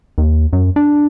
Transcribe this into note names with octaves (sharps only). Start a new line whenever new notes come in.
D#2
F#2
D4